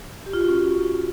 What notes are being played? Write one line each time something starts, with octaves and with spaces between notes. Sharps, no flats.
G4
F4
F#4
C#4